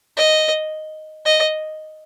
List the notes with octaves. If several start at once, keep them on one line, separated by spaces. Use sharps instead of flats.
D#5
D#5